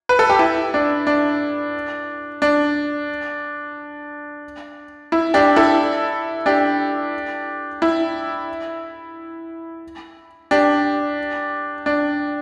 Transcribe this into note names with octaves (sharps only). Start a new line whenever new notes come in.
B4
A4
G4
E4
D4
D4
D4
E4
D4 G4
E4 A4
D4 G4
E4
D4 G4
D4